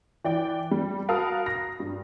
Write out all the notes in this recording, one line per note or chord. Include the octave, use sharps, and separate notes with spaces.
E3 D5 G5
G3
F#4 A#4 F5 A5 B5 D#6
A#6
G2